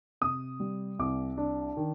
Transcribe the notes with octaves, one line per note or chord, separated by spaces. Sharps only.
C3 D#6
G3
C2 D6
D4
D#3